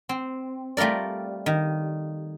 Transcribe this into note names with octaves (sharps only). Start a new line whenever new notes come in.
C4
G3 A3 F4 A#4 D5
D#3